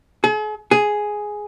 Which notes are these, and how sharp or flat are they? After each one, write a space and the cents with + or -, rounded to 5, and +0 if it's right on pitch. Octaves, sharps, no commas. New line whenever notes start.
G#4 +45
G#4 +5